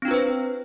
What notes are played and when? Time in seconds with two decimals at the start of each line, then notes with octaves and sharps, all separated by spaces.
0.02 C4
0.05 D4
0.08 F4
0.11 B4
0.14 C5